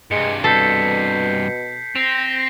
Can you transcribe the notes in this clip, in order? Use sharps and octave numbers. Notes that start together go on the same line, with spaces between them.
G2 C3 G#3 C#7
B2 A4 G6 B6 C7
C4 A#6 F7